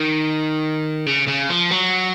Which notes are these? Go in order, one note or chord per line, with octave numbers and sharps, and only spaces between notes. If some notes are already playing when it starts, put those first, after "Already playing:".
Already playing: D#3
C#3
C#3
F3
F#3